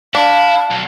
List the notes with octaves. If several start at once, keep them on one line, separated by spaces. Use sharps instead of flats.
D4 E4 F5
B1